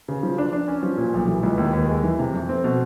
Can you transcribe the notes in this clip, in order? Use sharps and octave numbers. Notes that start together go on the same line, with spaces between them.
C#3
F3
D4
D4
C#4
F3
A#2
B1
E3
C#2
D#2
D#2
G#3
E3
C3
F2
C4
B2